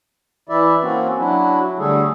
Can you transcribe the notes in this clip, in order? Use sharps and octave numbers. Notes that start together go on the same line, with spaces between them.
E3 E4 D5 E5
A#3 C4 C#4 F#4
F#3 D4 E4 F#4
D3 G3 A3 G#4 A4